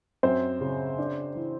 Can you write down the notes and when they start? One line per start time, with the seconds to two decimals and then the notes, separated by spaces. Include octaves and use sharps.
0.23 F#2 C4 C5
0.61 C#3
0.98 D4
1.36 E3